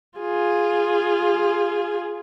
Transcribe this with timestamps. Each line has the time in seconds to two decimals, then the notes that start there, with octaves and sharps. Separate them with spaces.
0.18 F4 G#4